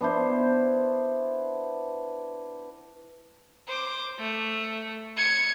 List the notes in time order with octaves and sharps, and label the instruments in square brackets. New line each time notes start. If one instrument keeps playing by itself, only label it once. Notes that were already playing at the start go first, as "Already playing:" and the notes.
[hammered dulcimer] B3 D4 E4 C5
[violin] C5 D6
A3
G#6 C#7